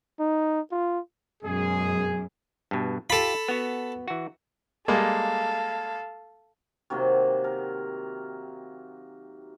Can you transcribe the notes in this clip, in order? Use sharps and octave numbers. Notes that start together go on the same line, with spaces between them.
D#4
F4
F#2 B2 G#3 G#4
G2 B2
F4 G4 A4 B5
B3 F#4
E3 F#4
G3 G#3 A#3 A4 F5
C3 D#3 F#3 A#3
A#4